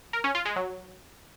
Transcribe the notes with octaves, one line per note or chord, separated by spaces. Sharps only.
A#4
C#4
F4
G#3
F#3